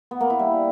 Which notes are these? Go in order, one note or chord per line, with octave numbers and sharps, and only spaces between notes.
B3
A#3
E4
G3